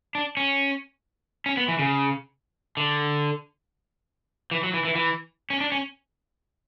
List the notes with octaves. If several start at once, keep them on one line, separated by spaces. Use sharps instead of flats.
D4
C#4
C#4
B3
E3
C#3
D3
E3
F#3
E3
E3
E3
C#4
D4
C#4